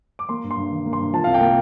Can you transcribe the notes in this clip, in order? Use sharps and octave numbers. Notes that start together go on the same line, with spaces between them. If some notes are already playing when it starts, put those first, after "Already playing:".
D6
A#3 C6
G2
C6
G2
D#3
A#3
C6
G2
F3 A5
C2 F5
G5
A#3